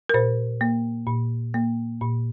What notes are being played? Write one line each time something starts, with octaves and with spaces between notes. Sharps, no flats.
A#4
A#2 C5
A#3
A#2
A#3
A#2